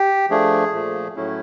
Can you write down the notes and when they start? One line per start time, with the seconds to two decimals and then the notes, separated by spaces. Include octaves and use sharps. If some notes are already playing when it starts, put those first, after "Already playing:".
Already playing: G4
0.30 F3 A3 D4 G#4
0.73 A#2 F3 A3
1.16 A2 F#3 A3 C#4 E4